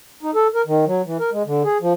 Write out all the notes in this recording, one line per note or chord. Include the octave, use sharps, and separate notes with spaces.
D#4
A4
A#4
D#3
F#3
E3
A#4
G#3
D3
G#4
F3